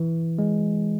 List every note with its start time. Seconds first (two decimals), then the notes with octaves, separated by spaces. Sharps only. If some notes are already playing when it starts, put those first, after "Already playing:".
Already playing: E3
0.39 G#3